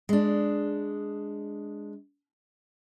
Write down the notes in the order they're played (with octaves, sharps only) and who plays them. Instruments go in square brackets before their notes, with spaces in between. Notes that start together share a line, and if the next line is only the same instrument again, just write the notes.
[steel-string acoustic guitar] G#3 D4